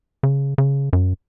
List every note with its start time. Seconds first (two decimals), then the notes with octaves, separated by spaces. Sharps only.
0.23 C#3
0.58 C#3
0.93 F#2